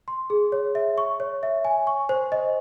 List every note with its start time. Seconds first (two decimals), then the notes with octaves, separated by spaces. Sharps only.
0.08 C6
0.30 G#4
0.52 C#5
0.75 E5
0.98 C#6
1.20 C#5
1.43 E5
1.65 G#5
1.87 C#6
2.09 C5
2.32 D#5